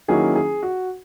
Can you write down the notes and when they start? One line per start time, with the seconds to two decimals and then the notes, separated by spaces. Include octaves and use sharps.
0.08 D#3 F#3 A#3 C#4 E4 G#4
0.36 G#4
0.63 F#4